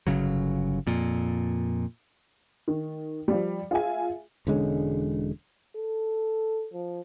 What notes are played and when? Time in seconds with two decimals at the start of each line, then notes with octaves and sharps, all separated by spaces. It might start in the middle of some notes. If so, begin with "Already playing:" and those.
0.07 G1 D2 C#3 F#3
0.87 F2 A#2
2.68 D#3
3.28 F3 G3
3.71 F4 G#4 E5 G#5
4.47 E1 D3 G#3 C#4
5.76 A4
6.73 F3